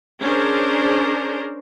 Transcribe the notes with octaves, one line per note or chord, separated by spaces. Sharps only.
C#4 D4 G#4 A#4 C5